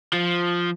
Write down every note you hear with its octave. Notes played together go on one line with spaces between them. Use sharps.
F3